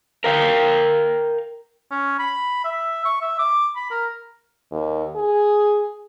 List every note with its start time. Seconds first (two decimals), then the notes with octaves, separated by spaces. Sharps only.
0.24 A#4 F5 G5
1.91 C#4
2.19 B5
2.64 E5
3.05 C#6
3.21 E5
3.39 D6
3.76 B5
3.91 A#4
4.71 D#2
5.16 G#4